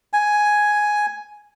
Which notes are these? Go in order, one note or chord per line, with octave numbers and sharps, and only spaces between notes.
G#5